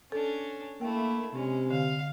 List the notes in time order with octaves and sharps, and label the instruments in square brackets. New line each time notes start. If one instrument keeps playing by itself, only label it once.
[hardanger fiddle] C#4 D4 [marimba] A4
[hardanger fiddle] A3 E4 [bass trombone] A#3 [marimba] G5
[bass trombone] C3 [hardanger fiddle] G#3 C#4
[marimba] D3 [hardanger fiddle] F5